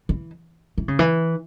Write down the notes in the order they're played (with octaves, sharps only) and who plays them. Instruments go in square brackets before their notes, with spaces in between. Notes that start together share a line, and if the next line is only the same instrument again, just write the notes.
[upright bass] E3
E3
C#3
E3